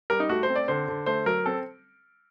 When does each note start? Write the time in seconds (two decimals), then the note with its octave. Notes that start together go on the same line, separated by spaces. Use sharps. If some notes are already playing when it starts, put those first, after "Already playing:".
0.10 G3 A#4
0.20 D#4
0.29 A3 F#4
0.43 C5
0.49 C4
0.56 D5
0.68 D3 C5
0.88 D3
1.06 A3 C5
1.26 F#3 A#4
1.46 C4 A4